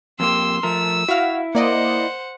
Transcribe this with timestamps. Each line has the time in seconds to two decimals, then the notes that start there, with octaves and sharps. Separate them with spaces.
0.20 F2 A#3 G4 C6 E6
0.63 F3 A3 A#4 E6
1.08 E4 F#4 F5
1.55 A#3 C5 D5 D#5 F#5